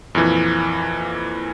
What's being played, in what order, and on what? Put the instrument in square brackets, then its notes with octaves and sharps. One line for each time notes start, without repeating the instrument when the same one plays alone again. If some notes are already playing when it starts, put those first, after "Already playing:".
[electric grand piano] F2 A#2 E3